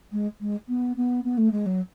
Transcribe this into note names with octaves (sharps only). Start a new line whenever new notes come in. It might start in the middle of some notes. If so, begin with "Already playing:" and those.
G#3
G#3
B3
B3
B3
A3
G#3
F#3